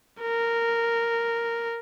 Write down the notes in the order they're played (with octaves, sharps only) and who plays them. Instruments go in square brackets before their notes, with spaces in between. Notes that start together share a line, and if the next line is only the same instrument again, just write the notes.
[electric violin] A#4